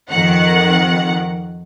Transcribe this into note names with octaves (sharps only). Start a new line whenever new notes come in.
F2 D#3 F#5